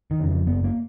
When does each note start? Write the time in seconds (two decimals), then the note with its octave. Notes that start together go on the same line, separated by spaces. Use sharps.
0.11 D#3
0.20 F2 C#3
0.29 F3
0.46 F#1 B3
0.64 A#3